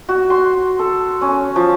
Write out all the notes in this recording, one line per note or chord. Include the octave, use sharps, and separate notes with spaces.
F#4
C6
A4
C#4
F3